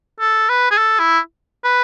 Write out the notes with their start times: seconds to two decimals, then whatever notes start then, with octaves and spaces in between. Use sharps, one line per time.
0.20 A4
0.49 B4
0.71 G#4
0.78 A4
0.99 E4
1.64 B4